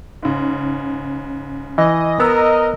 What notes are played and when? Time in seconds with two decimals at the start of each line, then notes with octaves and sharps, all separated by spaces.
0.23 G#2 C#3
1.78 E3 D#5
2.20 B3 A#4 A#5 E6